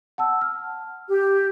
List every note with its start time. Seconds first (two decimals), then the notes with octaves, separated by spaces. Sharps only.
0.18 F#5 A5 E6
0.41 F6
1.08 G4